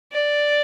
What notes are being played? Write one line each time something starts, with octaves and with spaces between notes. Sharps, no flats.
D5